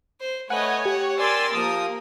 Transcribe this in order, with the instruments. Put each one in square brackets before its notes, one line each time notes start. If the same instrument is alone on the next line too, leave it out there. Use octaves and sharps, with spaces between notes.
[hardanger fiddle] C5
[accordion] A3 G#5 [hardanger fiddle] B4 D#5 [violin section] C#5 [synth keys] F#5
[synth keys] G4 [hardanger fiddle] F#5
[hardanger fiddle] A#4 [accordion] D5 G#5 [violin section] C6 E6 A6
[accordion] F3 D#6 [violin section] A#3